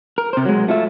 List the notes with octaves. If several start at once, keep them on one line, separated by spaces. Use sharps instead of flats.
A#4
C3 C5
F#3 G#3
A3 F4 E5